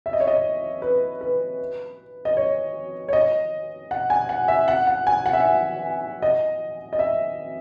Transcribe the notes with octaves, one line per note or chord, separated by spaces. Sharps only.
E5
D#5
C#5
D#5
B4
B4
D#5
C#5
C#5
D#5
F#5
G#5
F#5
E5
F#5
F#5
G#5
F#5
E5
F#5
D#5
D#5
E5